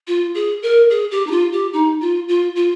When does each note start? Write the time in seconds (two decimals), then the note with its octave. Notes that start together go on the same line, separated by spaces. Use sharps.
0.07 F4
0.35 G#4
0.62 A#4
0.90 G#4
1.11 G4
1.27 D#4
1.31 F4
1.52 G4
1.73 D#4
2.01 F4
2.28 F4
2.56 F4